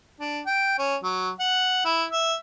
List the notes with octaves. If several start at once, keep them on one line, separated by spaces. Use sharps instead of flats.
D4
G5
C#4
F#3
F#5
E4
E5